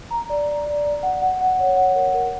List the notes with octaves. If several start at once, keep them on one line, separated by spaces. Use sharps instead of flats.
A#5
D5
D5
D5
D5
F#5
F#5
F#5
C#5
F#5
A#4
A#4